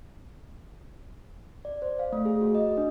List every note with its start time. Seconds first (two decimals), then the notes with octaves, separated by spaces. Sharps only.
1.65 D5
1.82 C5
1.99 F5
2.13 A3
2.25 G#4
2.41 F#4
2.55 D#5
2.77 D4